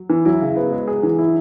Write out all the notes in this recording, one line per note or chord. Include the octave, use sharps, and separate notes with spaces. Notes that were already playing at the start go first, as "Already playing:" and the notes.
Already playing: F#3
E3
F#3 E4
C#3
B3
G#3
G#4
E3
E4